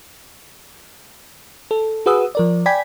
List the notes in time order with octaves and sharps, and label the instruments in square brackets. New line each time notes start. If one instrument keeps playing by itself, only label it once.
[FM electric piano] A4
F#4 G#4 B4 F#5 D#6 E6
F3 A#4 D5
D5 G5 G#5 B5 G#6 B6